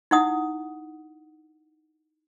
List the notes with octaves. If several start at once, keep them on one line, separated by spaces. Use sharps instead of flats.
D#4 E4 F#5 D#6